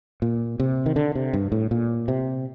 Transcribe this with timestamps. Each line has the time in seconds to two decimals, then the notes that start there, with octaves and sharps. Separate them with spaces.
0.22 A#2
0.60 C3
0.86 D#3
0.96 D3
1.15 C3
1.33 G2
1.52 A2
1.71 A#2
2.08 C3